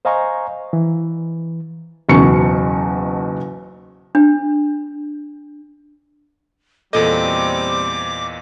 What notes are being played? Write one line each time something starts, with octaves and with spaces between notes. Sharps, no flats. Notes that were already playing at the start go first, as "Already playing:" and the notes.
C5 D#5 F5 G#5 A#5 C#6
E3
F#1 B1 E2 C#6 C#7
D4
E2 A#2 G3 C4 A4 D#5 D6